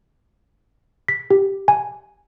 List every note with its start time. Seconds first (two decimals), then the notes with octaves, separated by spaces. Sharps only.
1.08 B6
1.31 G4
1.68 G#5